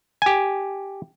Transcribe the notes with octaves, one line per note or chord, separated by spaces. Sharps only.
G4 G#5